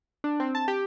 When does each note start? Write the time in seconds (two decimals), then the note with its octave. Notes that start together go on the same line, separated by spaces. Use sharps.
0.24 D4
0.40 C4
0.55 A5
0.68 G4